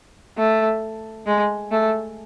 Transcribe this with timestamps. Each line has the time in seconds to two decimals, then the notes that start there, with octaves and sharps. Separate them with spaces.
0.38 A3
1.26 G#3
1.72 A3